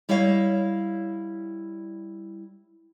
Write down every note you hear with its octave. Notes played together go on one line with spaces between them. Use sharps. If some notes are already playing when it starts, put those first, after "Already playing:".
G3 E4 C#5 D#5 F5